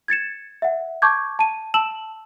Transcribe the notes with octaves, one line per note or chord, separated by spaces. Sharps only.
G#6 A6 C#7 E7
E5 F#5
A5 C#6 D6 G6 G#6
A5 D#7
A5 E6 E7 F#7